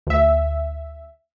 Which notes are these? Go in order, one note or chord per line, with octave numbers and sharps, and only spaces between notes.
D2 E5